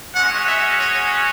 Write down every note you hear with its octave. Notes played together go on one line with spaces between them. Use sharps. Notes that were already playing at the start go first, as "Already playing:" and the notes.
G#3 C#4 F#4 F#5
E5
C#5